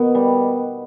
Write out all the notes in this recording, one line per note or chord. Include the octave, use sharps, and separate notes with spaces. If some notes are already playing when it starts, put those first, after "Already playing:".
Already playing: B2 D#3 B3
G3